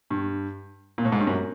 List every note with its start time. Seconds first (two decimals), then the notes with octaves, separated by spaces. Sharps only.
0.11 G2
0.98 A#2
1.05 A2
1.12 G#2
1.20 G2
1.27 F#2